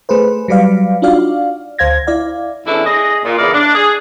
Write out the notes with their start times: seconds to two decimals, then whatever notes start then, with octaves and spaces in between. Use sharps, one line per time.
0.09 A3 G#4 B4 C5
0.48 F#3 G3 B4 D5 F5
1.02 D4 D#4 F4 F#4 D5 F5
1.79 D2 C5 F5 G#6 A#6
2.07 E4 D5 F5
2.67 E2 A3 C#4 D4 E4
2.86 G#4 D#5
3.25 A#2
3.38 E2 C#3 E4 A#4 D5 F5
3.54 D4
3.75 G#4